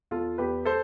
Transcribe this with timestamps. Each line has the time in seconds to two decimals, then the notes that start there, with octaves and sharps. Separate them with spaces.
0.11 E2 F4 A4
0.38 E2 G4 B4
0.65 A4 C5